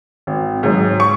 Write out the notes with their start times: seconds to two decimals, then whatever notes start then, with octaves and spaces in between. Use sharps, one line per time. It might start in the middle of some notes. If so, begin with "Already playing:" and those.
0.27 G#1
0.63 G#2 F#3
1.00 C#6